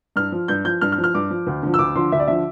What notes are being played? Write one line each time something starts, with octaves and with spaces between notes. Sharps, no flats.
G2 F6
F3
G2 G6
F3 G6
G2 F6
F6
F3
F6
G2 D6
F3
D2
D3 F3
E6
D2 D6
D3 F3 C6
D2 E5
D5
D3 F3 E5